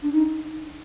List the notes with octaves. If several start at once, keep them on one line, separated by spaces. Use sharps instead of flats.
D4
D#4